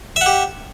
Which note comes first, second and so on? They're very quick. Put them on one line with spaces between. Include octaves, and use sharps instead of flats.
E5 F#5 G4